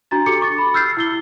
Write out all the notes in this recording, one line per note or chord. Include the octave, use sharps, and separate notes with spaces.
D4 F#4 A#5 A6
G4 A4 D6 C#7
C#6 D6 A6
B5
E6 F6 G6 A6 C7
E4 E6 G7